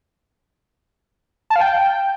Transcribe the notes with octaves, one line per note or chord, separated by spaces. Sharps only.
A5
F5
G5